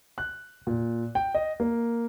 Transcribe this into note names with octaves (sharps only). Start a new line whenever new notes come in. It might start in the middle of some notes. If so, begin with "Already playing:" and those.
F#6
A#2
G5
D#5
A#3